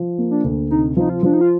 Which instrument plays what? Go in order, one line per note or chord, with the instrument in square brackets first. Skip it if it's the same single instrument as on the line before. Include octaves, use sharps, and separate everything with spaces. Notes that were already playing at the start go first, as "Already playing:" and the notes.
Already playing: [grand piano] F3
A#3
[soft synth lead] D4
[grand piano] D2
[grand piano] C3 [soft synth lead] D#4
[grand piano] F3 [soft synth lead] D#4
[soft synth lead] F4
[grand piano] F3 [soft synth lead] D4
[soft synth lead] D#4
F4